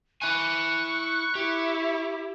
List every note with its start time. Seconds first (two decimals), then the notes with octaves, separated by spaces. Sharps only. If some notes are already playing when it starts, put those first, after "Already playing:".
0.22 E4 G#5 C#6 F#6
1.35 E4 G4